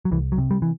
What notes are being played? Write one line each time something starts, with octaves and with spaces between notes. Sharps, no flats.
F#3
C2 E3
F#3
C3
G3
E3